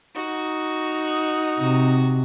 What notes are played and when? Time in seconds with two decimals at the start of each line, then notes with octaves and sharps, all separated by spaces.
0.16 D#4 F#4
1.60 C3